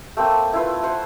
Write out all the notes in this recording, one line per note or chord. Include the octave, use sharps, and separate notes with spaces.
A3 A#3 C4
E4 F4 B4
C5 F#5